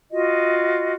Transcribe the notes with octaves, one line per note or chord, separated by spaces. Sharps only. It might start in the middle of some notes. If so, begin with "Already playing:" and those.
F4 F#4 D#5